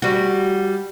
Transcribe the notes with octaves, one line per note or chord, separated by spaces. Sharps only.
G3 F#4